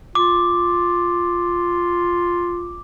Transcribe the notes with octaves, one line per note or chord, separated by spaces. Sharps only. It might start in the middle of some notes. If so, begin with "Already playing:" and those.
F4 D6